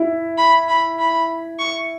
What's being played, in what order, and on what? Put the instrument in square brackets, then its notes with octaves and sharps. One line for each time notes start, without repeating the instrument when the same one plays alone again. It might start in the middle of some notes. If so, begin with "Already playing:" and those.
Already playing: [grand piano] E4
[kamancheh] B5
B5
B5
C#6